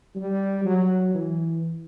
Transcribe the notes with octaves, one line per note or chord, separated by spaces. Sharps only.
G3
F#3
E3